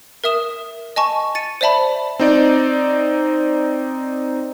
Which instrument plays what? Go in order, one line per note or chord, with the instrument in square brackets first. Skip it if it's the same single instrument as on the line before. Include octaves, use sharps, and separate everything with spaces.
[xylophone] A#4 E5 D#6 E7
D#5 G#5 A5 C#6
A6 C#7 D#7
C5 D5 E5 A5 B5
[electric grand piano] C4 D#4 D5